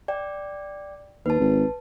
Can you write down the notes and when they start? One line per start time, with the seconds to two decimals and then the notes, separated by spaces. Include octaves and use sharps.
0.08 D5 G5
1.26 D#2 B4 A5
1.40 G#1